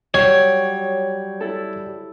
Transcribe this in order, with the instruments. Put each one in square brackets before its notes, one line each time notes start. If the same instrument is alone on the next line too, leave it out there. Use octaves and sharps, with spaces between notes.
[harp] F#3 [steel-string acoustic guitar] G3 [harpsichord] C#5
[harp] E4 A4